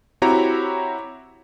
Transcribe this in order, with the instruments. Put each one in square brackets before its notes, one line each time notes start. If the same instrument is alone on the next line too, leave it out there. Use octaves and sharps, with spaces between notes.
[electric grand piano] C4 E4 F#4 G4 C#5 A#5